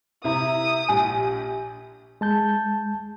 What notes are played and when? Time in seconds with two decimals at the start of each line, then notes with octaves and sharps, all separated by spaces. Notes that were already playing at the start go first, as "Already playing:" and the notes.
0.24 C3 E4 A#5 D#6
0.89 A#1 G4 G#5
2.21 G#3 A5 G6